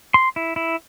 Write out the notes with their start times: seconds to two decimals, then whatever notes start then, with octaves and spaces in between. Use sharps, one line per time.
0.14 C6
0.36 E4
0.56 E4